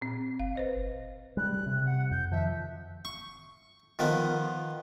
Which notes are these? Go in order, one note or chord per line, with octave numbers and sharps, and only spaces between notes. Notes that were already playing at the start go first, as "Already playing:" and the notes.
A#2 C4
G1 F5
B4 C5 D#5
G3 G#3 F#6
C3
F#5
F2 G6
D#3 F3 E5
C#6
D#3 F3 B3